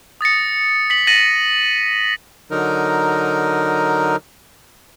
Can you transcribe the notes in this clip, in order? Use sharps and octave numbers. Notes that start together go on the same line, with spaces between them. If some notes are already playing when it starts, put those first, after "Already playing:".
D#6 A6 A#6 C#7
B6 F#7
A6 A#6 D#7 F#7
D3 F#3 D#4 A#4